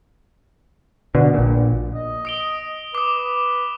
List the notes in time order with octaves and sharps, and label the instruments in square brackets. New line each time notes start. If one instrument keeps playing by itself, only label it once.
[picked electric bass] B2 D3
A#1 A#2
[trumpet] D#5
[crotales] D#6 D7 G7
[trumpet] B4 [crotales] D6 D#6